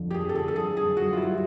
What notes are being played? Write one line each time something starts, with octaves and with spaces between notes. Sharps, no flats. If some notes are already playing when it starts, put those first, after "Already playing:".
Already playing: F2 D3 F3
G4
F2 G#4
A4
D3 G#4
A4
F3 G#4
F#2 G#4
F#2 F#4
F4
G3 E4